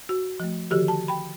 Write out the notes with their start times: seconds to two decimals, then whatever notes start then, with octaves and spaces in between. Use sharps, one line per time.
0.09 F#4
0.40 F3 A3
0.70 D3 D#3 F3 F#4 G4 A4
0.88 A5
1.08 G5 B5